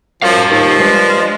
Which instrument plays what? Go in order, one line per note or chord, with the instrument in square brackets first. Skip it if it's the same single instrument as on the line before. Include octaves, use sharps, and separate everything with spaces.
[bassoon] F#2 [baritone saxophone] F3 [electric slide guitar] G3 F5
[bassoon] D#2 [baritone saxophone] F3
[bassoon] G2 [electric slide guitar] G#3